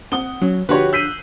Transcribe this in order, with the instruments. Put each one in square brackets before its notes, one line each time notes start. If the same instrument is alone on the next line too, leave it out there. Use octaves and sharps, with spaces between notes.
[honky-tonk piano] C4 F#5 D#6 [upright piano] G7
[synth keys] F#3 [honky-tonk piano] C#4
[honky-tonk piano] D3 F3 [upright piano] F#4 G4 C#5 [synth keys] B4
[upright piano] E6 B6 D#7 [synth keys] F#6 G6 C7